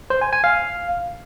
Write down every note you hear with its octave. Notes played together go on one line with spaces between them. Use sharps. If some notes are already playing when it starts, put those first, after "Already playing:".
C5
G#5
G#5
F5